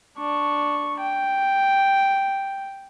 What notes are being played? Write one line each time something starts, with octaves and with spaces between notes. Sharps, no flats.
D4 C#6
G5